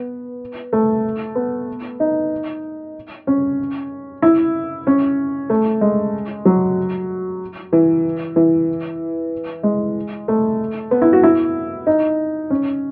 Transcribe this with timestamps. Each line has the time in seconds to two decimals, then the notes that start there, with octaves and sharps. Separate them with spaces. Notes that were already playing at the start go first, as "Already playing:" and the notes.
Already playing: B3
0.73 A3
1.35 B3
2.00 D#4
3.27 C#4
4.22 E4
4.87 C#4
5.50 A3
5.81 G#3
6.45 F#3
7.73 E3
8.36 E3
9.63 G#3
10.28 A3
10.91 B3
11.02 E4
11.13 F#4
11.23 E4
11.87 D#4
12.50 C#4